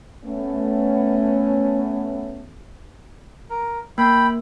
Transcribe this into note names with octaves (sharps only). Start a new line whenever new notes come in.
A3 B3 C#4
A#4
A#3 G5 B5